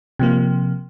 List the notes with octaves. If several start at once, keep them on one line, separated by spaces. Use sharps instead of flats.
C3 F3 A#3